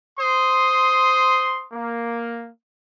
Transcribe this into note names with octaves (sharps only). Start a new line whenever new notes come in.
C5 C6 D#6
A#3